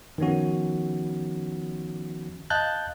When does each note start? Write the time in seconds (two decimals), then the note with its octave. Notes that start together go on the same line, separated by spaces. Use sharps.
0.18 D#3 F3 B3 C#4 F#4
2.50 D#5 F5 A5 F#6 G6 A6